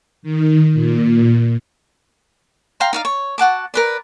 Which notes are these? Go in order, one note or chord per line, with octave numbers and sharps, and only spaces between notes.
D#3
A#2
F5 G5 A#5 C6
D#4 D5 F5
C#5
F#4 F#5 A5 D6
A#4 B4 D5